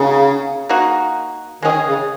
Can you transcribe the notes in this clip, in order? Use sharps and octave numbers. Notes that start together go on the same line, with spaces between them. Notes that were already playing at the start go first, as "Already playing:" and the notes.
Already playing: C#3 A#3 D#4 F#4
A#3 D#4 F#4
D#3 G#3 C#4 G#4
C#3